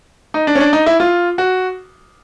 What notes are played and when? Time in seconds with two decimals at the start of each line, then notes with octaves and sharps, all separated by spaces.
0.34 D#4
0.47 D4
0.55 C#4
0.60 D4
0.73 D#4
0.86 E4
1.00 F4
1.38 F#4